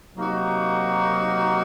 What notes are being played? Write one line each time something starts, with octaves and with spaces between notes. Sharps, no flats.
C3 F#3 A#3 D#4 F#4